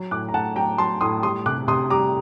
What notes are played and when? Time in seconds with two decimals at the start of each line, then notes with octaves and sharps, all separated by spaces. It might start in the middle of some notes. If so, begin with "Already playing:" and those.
Already playing: F#3
0.11 A2 D6 F#6
0.29 A#5
0.34 A2 F#5 A5
0.56 F#3 G5 A#5
0.78 F#3 A5 C6
1.01 A2 C6 D#6
1.23 G3 C6 D#6
1.46 C3 D6 F#6
1.68 C3 C6 D#6
1.90 G3 A#5 D6